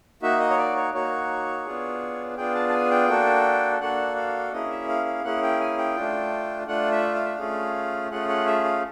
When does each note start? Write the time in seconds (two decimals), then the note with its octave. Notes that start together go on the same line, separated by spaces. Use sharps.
0.22 A#3 D#4 F#4 E5
0.40 D#5
0.50 C#5
0.58 D5
0.76 C#5
0.94 A#3 D#4 F#4 C#5
1.65 B3 D4 F4 G#4
2.37 B3 D4 F4 G#4 G5
2.55 A5
2.69 A5
2.73 G#5
2.91 G5
3.08 A#3 D4 F#4 A4
3.81 A#3 D4 F#4 A4 F#5
4.16 F5
4.52 A#3 C#4 E4 G#4 D#5
4.70 E5
4.89 F5
5.06 F5
5.24 A#3 C#4 E4 G#4 F#5
5.42 G5
5.60 G#5
5.78 G5
5.96 A3 D4 F4
6.67 A3 D4 F4 F#5
6.91 E5
7.15 F5
7.25 E5
7.35 A3 C#4 F4 G#4 F5
8.11 A3 C#4 F4 G#4 F#5
8.29 F#5
8.47 E5
8.65 F5